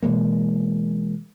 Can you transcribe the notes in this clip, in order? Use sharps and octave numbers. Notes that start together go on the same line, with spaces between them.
B2 E3 G#3 A#3